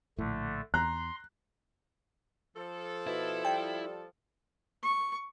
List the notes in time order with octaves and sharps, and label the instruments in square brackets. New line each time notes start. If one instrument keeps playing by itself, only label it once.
[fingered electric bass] A#1 A2 [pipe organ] D3 A3
[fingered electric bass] E2 [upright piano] A#5 [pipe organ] C6 [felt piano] F#6
[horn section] F3 A4
[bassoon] B2 [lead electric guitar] E4
[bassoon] G3 [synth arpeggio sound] G5
[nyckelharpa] C#6